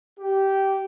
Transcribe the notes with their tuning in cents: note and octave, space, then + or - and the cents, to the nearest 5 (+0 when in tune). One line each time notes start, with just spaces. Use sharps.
G4 -15